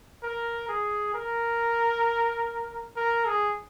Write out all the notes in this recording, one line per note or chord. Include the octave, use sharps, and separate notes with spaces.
A#4
G#4
A#4
A#4
G#4